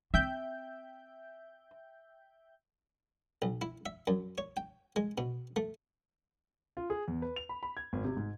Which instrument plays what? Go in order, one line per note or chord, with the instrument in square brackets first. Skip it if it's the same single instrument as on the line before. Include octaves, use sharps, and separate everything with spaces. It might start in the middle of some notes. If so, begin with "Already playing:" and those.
[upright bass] C4 [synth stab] E5 G5 G6
[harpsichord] B1
E4
E5
F#2
C#5
G5
G#3
B2
A3
[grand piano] F4
G#4
E2
B4
F7
B5
B5
G#6
G#1
C3
G#2